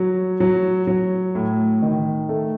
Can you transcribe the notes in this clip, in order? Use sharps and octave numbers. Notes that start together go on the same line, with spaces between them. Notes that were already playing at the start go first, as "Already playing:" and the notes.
Already playing: F#3
F#3
F#3
A2
D#3
A3